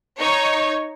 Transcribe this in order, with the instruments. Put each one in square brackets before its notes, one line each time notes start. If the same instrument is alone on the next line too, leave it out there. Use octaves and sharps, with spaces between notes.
[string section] D#4 C#5